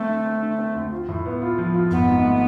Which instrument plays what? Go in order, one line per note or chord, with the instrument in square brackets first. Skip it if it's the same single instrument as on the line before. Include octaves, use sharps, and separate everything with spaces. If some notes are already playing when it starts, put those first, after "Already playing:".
Already playing: [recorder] A3 [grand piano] C4
[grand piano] D3
C4
D3
C4
D2
F4
A2
B3
F4
F3
F4
[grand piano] G#1 [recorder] B3
[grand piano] G#2
A3